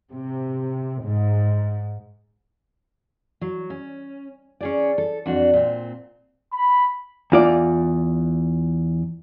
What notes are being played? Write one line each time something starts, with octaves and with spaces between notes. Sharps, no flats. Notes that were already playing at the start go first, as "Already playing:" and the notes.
C3
G#2
F#3
C#4
C#4 G#4 D5
A4
F2 D4 F#4
A#2 C4
B5
E2 F4 D5